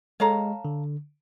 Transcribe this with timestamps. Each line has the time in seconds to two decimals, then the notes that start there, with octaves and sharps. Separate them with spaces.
0.20 G#3 A4 C#5 F5 A#5
0.65 D3